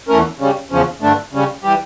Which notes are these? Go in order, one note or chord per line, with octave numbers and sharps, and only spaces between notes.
E2 E3 A3 C#4 A#4
C#3 G3 C#4
E2 C#3 F3 C#4
G2 D3 A3 D4
C#3 G3 C#4
E3 G3 G4